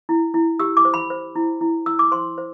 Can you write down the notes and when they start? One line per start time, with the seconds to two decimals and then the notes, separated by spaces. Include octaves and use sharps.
0.09 E4
0.34 E4
0.59 G4 E6
0.77 D6
0.85 C5
0.94 B5
1.10 C5
1.36 E4
1.61 E4
1.86 E4 E6
1.99 D6
2.12 C5 C6
2.38 C5